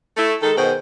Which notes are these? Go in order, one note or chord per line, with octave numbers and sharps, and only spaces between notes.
A3 E4
D#3 G#3 A4
B2 D#3 G#4 C5